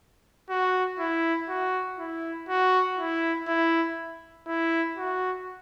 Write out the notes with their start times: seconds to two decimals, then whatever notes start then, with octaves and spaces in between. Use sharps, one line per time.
0.50 F#4
0.99 E4
1.49 F#4
1.99 E4
2.49 F#4
2.98 E4
3.48 E4
4.48 E4
4.98 F#4